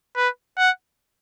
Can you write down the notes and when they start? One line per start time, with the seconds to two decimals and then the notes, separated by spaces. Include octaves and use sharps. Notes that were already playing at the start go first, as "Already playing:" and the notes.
0.16 B4
0.58 F#5